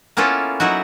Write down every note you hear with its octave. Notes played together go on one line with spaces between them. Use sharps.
A#3 B3 C#4 E4 F4 A4
F#3 D#4 E4 F#4